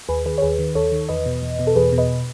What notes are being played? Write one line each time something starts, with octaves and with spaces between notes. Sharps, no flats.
D#2 G#4 B4
D#3 G#4 B4
C#5
D#2 G#4 B4
D#3
D#2 A4 C#5
D#3
E2 B4 D#5
B2
E2
B2
A4
E2 G#4 B4
B2
B4 D#5